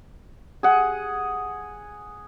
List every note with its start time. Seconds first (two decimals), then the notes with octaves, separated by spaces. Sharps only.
0.63 G#4 F#5